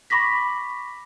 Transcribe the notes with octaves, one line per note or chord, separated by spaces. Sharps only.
B5 C#6 D6 A#6 B6